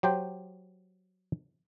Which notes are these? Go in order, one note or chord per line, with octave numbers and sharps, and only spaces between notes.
F#3 G4 C5 G5